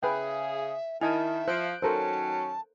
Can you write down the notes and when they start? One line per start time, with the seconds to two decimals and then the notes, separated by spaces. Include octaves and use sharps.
0.03 C#3 G#4 B4 E5 G5
1.01 D#3 E4 D#5 E5 G#5 A5
1.48 F3 C5 F#6 G6 D7
1.82 D#3 F#3 C#4 A4 A#4 C5 A5